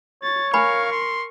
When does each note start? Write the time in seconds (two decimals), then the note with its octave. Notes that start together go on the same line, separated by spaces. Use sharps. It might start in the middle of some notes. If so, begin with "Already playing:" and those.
0.23 C#5 A6
0.54 A#4 F5 G#5 B5 C#6
0.91 C6